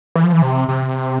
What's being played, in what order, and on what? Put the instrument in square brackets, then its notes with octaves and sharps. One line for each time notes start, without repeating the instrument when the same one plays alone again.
[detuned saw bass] E3
F3
E3
C3
C3